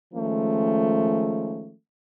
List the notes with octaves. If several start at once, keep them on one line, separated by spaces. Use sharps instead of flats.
D#3 F3 G#3 A3 C#4